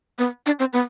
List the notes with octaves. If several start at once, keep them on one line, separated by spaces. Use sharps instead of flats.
B3
D4
C4
B3